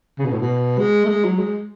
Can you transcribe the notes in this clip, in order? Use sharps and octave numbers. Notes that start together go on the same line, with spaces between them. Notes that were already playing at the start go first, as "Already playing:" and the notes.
C#3
B2
A2
B2
G#3
A3
G#3
F#3
G#3